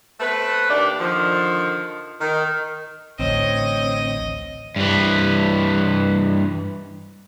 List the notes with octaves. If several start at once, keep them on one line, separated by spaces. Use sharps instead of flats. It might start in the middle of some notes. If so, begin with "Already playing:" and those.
A3 C4 B4
D#2 A#3 D4 D5
D3 D#3 F3
D#3
A1 D2 C4 C#5 D#5
G2 E3